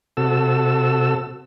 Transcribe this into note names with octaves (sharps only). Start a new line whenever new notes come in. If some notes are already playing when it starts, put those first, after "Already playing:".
C3 F#4 A4 E6